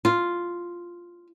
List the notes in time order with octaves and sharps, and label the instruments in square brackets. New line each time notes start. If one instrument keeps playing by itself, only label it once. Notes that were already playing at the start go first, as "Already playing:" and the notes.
[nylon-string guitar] F4